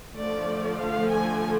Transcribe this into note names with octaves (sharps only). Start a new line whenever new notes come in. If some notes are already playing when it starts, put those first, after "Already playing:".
D3 F3 A3 D5
F5
G#5